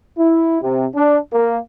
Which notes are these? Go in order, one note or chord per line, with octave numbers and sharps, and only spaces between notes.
E4
C3
D4
A#3